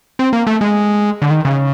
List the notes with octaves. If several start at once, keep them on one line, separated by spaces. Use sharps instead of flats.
C4
A#3
A3
G#3
D3
D#3
C#3